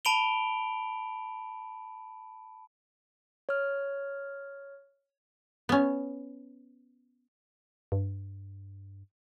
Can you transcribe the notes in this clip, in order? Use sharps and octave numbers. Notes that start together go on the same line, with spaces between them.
A5 B5 D7 F7 G7
C#5 F6
B3 C#4
G2